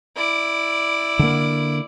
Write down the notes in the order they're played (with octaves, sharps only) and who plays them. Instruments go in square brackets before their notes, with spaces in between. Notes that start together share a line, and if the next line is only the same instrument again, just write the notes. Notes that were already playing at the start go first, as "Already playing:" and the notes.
[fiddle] E4 D5
[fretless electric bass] D3 A#3